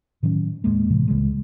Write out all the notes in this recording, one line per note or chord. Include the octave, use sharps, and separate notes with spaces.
A2 D#3 F#3 C#4
D#2 A2 G#3 A#3
A2 C3 E3
C#2 C#3 G3 G#3